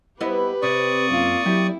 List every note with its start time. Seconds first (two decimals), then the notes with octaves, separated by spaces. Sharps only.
0.21 B3 E4 G4 B4 D#5
0.62 C3 D5 C#6 D#6
1.10 F#2 A#3 F4
1.46 F#3 E4 G4